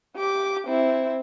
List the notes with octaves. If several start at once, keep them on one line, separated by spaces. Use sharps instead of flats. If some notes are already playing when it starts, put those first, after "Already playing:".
G4 D6
C4 E4